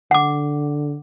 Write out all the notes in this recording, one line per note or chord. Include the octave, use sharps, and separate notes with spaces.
D3 F#5 D6